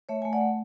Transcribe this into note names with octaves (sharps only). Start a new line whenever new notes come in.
A3 C#5 E5
A3 G#5
D5 F#5
A3